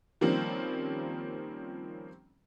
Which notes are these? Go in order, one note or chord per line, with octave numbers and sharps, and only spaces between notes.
D#3 F3 G3 A#3 C4 C#4